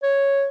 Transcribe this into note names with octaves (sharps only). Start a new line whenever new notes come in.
C#5